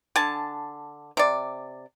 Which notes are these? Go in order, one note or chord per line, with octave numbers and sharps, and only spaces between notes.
D3 G#5 A5
C3 D5